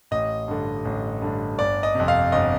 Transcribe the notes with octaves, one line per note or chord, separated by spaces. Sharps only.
A1 D#5
G2 D3
A1
G2 D3
G1 D5
D#5
F2 C3
F5
G1 D#5